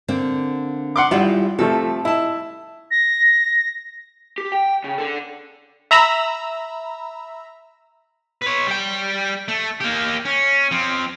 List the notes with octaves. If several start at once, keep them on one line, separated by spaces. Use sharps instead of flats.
D3 A#3 C4
F#5 C6 D6
G#1 G3 E4 F4
C3 F3 A3 A4
E4 D#5 A5
A#6
G4
G5
C#3
D4 A4
E5 A#5 B5 E6
B4 C#5
G3 G5
A3
A#3 G4
C#4
F3 C4